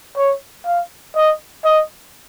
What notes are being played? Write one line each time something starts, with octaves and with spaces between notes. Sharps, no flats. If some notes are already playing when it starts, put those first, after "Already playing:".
C#5
F5
D#5
D#5